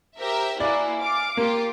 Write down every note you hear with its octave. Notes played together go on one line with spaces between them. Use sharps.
G4 A#4 C5 E5
A#3 E4 F#4 D5 G#5
F5 D6
A#3 F4 G4 A#4